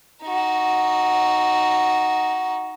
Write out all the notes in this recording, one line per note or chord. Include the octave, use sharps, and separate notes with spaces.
D#4 F#4